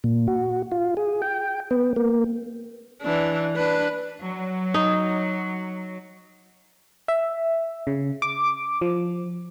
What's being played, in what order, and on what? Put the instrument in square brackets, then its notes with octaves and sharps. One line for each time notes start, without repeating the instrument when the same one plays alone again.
[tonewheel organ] A#2
F#4
F4
G#4
G5
B3
A#3
[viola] E3 D4
D4 B4
[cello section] F#3
[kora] D#4
[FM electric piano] E5
C#3
D6
F3